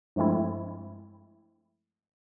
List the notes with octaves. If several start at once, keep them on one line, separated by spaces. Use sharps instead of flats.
G2 F3 G#3 A3 C4 E4